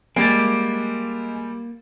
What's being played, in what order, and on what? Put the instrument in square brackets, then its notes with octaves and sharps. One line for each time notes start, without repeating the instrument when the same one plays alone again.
[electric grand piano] G3 G4 A6 [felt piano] G#3 [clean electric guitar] A#3